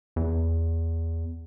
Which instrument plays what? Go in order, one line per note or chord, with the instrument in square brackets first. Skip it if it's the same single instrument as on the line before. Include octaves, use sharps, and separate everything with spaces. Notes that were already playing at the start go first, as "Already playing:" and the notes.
[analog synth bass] E2